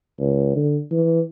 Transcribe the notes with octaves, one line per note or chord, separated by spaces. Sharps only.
C#2
D3
E3